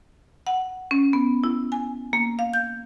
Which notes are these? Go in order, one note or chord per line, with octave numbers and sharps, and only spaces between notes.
F#5
C#4
B3
E4
G#5
A#3
F5
G6